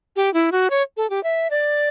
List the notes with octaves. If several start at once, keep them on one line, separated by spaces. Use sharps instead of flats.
G4
E4
F#4
C#5
A4
G4
E5
D5